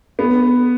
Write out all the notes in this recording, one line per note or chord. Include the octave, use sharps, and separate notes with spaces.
B3